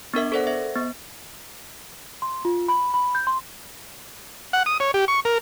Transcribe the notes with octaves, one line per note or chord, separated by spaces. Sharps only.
B3 D4 A#4 E5
A4 A#4 C5 D5 F#5
C5 E5 A#6
B3
C6
F4
B5
B5
G6
C6
F#5
D#6
C#5
G4
C#6
A#4